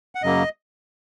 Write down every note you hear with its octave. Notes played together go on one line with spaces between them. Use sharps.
F#5
F#2 C#3 F#3 A#3 D#5